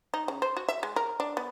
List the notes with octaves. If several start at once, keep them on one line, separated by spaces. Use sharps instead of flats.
D#4
C#3
C5
F#4
E5
G#3
A#4
D4
B3